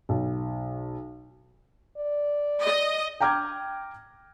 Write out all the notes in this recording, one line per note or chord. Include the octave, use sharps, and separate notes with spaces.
B1
D5
D#5
G5 A#5 D6 F6 G6 G#6